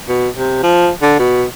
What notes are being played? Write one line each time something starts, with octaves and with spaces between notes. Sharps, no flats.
B2
C3
F3
D3
B2